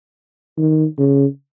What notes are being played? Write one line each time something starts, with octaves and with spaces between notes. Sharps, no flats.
D#3
C#3